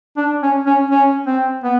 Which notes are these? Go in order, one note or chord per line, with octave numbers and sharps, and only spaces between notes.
D4
C#4
C#4
C#4
C4
B3